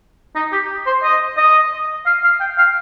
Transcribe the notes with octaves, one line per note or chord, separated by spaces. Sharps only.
D#4
G4
C5
D#5
D#5
F5
F5
G5
F5